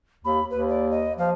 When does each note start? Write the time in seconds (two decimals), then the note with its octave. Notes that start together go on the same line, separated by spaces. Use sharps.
0.25 D#2 B5
0.51 D#2 B4
0.69 D5
0.91 D#5
1.18 F3 F5